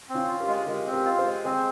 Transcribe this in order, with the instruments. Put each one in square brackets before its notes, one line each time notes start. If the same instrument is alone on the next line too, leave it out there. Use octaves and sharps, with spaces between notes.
[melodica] C4
[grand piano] C#4 F4
[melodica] F4
[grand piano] G4 A#4
[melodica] G#3
[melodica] G#3 [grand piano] G4 A#4
[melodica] C4
[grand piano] G4 A#4
[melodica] F4
[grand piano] G#4 C5
[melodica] G#3
[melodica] C4 [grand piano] G#4 C5